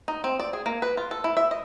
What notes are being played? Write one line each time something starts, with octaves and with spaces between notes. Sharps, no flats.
D#4
C4
D5
G#4
A#3
B4
F4
A4
E4
E5
D#5